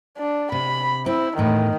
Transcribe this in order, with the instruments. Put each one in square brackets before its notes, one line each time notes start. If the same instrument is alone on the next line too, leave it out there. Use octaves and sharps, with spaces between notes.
[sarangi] D4
[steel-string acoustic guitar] C3 [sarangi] B5
[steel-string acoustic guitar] C4 [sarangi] E4
[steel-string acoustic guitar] E2 A2 [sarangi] D#3